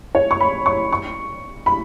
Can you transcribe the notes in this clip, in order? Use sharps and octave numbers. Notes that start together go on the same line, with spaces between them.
C#5
C#6
B5
C#6
C#6
B5